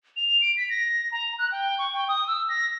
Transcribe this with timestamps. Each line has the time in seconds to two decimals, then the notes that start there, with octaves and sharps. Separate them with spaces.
0.16 F7
0.41 D7
0.57 B6
0.70 A#6
1.12 A#5
1.39 F#6
1.52 G5
1.78 C#6
1.94 G5
2.09 D#6
2.28 E6
2.49 A#6